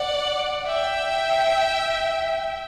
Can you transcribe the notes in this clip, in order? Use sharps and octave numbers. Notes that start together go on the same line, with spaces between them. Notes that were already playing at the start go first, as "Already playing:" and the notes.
Already playing: D5 F#5
E5 G5